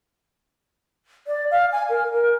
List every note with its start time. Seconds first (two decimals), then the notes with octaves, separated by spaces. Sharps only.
1.27 D5
1.51 F5
1.72 G#5
1.89 A#4
2.12 A#4